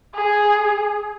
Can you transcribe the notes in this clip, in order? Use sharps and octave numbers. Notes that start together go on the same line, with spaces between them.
G#4